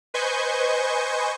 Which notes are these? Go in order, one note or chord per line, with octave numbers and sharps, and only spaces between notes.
B4 C5 D#5 G#5 C#6 G6